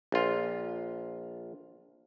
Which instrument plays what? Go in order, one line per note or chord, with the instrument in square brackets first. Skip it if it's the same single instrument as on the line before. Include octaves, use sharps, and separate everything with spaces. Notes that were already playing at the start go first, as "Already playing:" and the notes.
[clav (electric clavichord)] A#1 F4